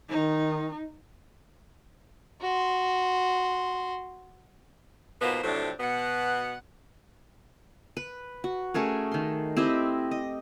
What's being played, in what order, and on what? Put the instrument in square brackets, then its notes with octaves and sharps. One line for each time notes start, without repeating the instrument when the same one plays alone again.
[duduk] D#3 [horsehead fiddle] D#4
[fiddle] F#4 C6
[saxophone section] G#2 B2 A#3 B3 F4 C5
F2 A2 C3 F#3 C4 D4
B2 B3 F#5
[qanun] B4
F#4
A3 C#4 G#4 A#4
D#3 C6
C4 E4 G4 D#5
D#5